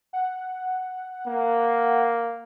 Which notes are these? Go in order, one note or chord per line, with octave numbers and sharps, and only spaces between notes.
F#5
A#3